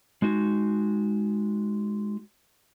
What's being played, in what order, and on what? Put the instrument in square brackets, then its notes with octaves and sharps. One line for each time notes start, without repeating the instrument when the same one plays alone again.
[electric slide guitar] G#3 D#4 F#4